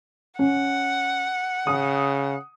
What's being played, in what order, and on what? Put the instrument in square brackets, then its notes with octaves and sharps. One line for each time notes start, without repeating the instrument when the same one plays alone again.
[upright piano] C#4 [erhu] F#5
[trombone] C#3 [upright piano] D#6